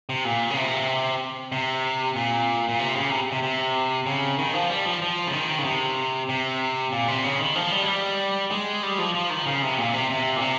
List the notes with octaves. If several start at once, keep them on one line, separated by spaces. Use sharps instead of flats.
C3
A#2
C#3
C3
C3
A#2
A#2
C3
C#3
C3
C3
C3
C#3
D#3
F3
G3
F3
F3
C#3
D#3
C#3
C3
C3
A#2
C3
C#3
D#3
F3
G3
G#3
G3
G#3
G3
F3
F3
D#3
C#3
C3
A#2
C3
C3
A#2
C3